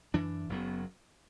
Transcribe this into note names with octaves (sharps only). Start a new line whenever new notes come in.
F#2 E3 D4
F#1 F#2 F#3 B3